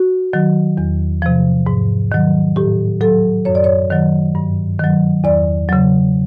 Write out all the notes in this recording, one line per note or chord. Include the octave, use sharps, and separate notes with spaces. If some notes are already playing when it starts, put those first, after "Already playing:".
Already playing: F#4
D#3 F#3
E2
C3 F3
G#2
D#3 F#3
A2 G4
F#3 A4
F#2 C#5
D5
C#5
D#3 F#3
G2
D#3 F#3
E2 D5
C#3 F#3